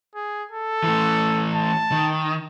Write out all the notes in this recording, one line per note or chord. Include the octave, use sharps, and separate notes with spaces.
G#4
A4
E3 A3
A5
D#3